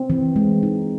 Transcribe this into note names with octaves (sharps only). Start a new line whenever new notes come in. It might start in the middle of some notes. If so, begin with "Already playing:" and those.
Already playing: C4
E3
G#3
D#4